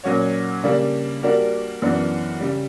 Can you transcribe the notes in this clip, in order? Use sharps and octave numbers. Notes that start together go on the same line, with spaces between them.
A#2 F#3 C#4 F#4 C#5
C#3 G3 A#3 D4
G3 A#3 D4 F#4 A#4
F#2 E3 B3 D4
C#3 G3